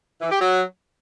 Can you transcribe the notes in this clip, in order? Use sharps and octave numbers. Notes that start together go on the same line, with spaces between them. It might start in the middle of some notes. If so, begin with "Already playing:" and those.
E3
G4
F#3